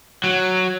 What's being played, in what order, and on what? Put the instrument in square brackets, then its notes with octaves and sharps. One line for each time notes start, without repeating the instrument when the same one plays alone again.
[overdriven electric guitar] F#3